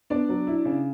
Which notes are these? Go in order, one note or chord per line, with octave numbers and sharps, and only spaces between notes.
B3 D4 D5
F#3
E4
C#3